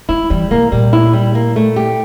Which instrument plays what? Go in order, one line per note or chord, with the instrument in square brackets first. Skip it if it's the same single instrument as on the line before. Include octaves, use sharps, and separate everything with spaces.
[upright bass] F3 [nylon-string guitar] E4
[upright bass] E3 [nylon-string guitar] G3
[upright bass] C3 [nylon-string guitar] A#3
[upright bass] A#2 [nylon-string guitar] G3
[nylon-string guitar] E4
G3
A#3
A3
G4